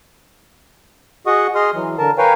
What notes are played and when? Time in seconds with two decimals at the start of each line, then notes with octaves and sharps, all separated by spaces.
1.27 F#4 G#4 D#5 F#5 C#6 D#6
1.55 G#4 D#5 C6 D#6 F6
1.75 E3 F#3
1.98 D3 A#4 A5
2.18 A#4 B4 C#5 F5 G5 G#5